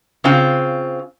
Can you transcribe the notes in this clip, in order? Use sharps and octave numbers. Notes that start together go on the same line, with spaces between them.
C#3 C4 F4